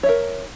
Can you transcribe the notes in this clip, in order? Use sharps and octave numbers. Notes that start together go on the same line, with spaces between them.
A#4 C#5 E5